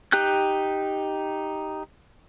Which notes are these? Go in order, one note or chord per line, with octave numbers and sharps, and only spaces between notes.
D#4 G4 G5 F#6 G6